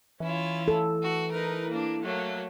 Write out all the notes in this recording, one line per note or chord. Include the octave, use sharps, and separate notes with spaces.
E3 C#4 E4 F4
A4
F#4
D#4 A#4 B4
A#3 D4
F#3 A3 A#3